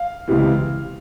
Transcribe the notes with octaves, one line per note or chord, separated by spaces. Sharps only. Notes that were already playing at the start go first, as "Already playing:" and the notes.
Already playing: F5
C#2 C3 E3